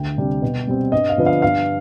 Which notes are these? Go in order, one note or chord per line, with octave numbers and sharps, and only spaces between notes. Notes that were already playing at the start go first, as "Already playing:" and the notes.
Already playing: D2 G5
C3 G3 D4
B2
G3 C4
G2 D#5
F5
D3 F3 B3 D4
F5
G2 F5